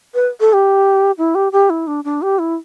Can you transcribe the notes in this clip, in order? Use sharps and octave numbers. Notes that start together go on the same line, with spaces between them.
B4
A4
G4
E4
G4
G4
E4
D4
D4
G4
E4